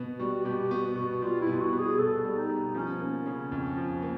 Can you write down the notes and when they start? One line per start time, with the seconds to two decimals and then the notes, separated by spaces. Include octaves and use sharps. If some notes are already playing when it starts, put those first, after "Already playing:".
Already playing: B2 B3
0.19 G3 F#4
0.45 B2 G4
0.70 B3 F#4
0.96 B2 F#4
1.22 G3 F4
1.41 E4
1.47 B2
1.60 F#4
1.73 B3
1.79 G#4
1.98 B2 A4
2.24 G3
2.37 D#4
2.49 B2
2.74 F3 C#4
3.00 A#3
3.26 C#3
3.52 F2
3.77 F3
4.02 A#3